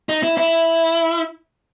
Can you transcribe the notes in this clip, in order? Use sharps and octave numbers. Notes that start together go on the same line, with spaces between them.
D#4
E4
E4